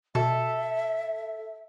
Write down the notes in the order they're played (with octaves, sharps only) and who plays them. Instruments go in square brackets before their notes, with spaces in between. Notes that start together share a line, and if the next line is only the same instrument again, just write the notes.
[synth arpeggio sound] B2 [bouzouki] A4 [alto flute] E5